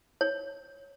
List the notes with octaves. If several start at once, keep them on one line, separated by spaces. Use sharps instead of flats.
C#5